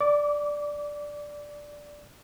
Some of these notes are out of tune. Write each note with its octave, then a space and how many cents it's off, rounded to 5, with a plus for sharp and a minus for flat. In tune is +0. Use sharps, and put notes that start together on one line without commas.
D5 +0 D6 -25